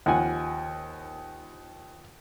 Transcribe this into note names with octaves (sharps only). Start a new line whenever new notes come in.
D#2 F3 F#5 G#5